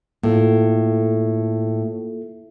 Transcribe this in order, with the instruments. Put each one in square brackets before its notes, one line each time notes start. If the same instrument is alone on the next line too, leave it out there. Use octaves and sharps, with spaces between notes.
[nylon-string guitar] A2 [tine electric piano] A#3 F4 A4